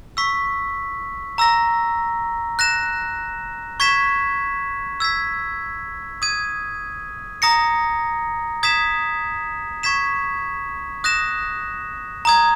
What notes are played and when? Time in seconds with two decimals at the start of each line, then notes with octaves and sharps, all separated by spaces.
0.17 C#6 E6 B6
1.38 A#5 E6 A#6
2.59 F#6 A#6 E7
3.80 C#6 G#6 B6 E7
5.00 E6 G#6 B6
6.22 D#6 G#6 D#7
7.42 A#5 D#6 A#6 C#7
8.63 D#6 G#6 B6 E7
9.83 C#6 G#6 B6 E7
11.04 D#6 F#6 A#6 E7
12.25 A#5 D#6 G#6